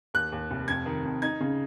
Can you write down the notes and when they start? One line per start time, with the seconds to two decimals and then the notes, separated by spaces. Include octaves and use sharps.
0.14 D#2 F#6
0.32 D#2
0.51 F1
0.68 F2 G#6
0.86 D#3
1.05 F2
1.22 D#4 G#6
1.40 C#3